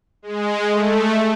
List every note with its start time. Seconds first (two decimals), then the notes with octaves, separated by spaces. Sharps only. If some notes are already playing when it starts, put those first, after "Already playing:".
0.22 G#3
0.70 A3